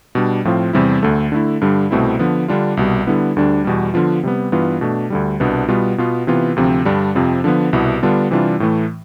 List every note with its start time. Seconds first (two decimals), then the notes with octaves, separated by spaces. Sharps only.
0.15 B2 G3 D4
0.45 A2 F3 C4 F4
0.73 E2 C3 G3 C4 E4
1.02 D2 D3 A3
1.32 D3 A3 E4
1.61 G2 D3 G3
1.91 C2 B2 A3 C4 E4
2.19 D3 F3 B3
2.48 D3 G3 D4 F4
2.77 C2 B2 G3
3.07 D3 G3 B3 E4
3.36 D2 D3 G3 D4
3.65 E2 B2 G3
3.94 D3 F3 B3 F4
4.23 C3 G3 B3
4.52 G2 E3 B3 F4
4.81 B2 A3 D4
5.10 D2 D3 G3
5.40 C2 B2 B3 D4
5.68 B2 G3 B3 F4
5.98 B2 B3 F4
6.27 C3 E3 B3 F4
6.56 D2 C3 F3 C4
6.85 G2 D3 G3 D4
7.15 F2 C3 F3 C4
7.44 D3 F3 B3
7.73 C2 B2 B3 E4
8.03 D3 G3 B3 D4 F4
8.31 C3 E3 G3 D4 F4
8.60 A2 E3 A3